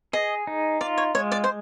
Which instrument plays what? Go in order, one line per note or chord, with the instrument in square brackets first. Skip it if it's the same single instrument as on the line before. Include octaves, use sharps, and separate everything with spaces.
[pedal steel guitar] G#4 [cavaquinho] D#5
[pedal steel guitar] D#4
[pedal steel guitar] F4 [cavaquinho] D5
[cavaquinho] C#5
[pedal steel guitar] G#3 [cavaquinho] C#5
[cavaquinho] D5
C5